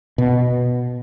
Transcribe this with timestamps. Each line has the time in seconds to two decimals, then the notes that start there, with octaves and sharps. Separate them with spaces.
0.18 B2